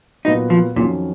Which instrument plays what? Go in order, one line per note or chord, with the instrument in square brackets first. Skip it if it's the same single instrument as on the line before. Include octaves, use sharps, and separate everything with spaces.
[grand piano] A#2 F#3 B3 F#4 [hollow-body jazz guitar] D#4
[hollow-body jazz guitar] F3
[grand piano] F2 D#3 F#3 C#4 [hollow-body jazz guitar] A#2